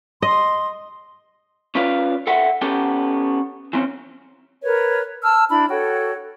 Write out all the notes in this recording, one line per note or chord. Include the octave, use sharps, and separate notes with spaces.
D#5 C6
C#4 F4 B4 D5 F5
A4 E5 F#5 G5
B3 C#4 G4 A4 G5
E3 C4 C#4
A#4 B4 C#5
A5 E6 F6
D4 E4 B5
F#4 A4 C#5 G5